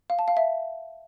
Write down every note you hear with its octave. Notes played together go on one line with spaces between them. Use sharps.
F5
A5
F5
E5